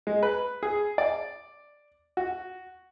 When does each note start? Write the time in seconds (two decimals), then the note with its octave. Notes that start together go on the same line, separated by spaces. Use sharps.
0.07 G#3
0.23 B4
0.63 G#4
0.98 D5
2.17 F#4